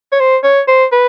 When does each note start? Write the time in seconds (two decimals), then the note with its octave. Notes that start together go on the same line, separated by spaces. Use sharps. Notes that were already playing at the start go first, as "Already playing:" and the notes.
0.12 C#5
0.20 C5
0.44 C#5
0.68 C5
0.92 B4